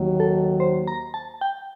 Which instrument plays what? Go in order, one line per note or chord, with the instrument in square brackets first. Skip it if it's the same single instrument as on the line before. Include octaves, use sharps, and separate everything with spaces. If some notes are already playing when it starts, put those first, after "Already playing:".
Already playing: [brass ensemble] D#2 D#3 F#3
[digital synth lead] A4
C5
A#5
A5
G5